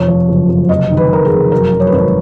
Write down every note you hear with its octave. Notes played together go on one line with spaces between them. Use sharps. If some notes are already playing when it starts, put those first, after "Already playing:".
Already playing: F1 F2 C#5
F3
F#1
F#1
F1 D#5
D#3
B4
F1 A#4
G#4
F1
F#2 A#4
F#2
C#5
B4
G#1 C#5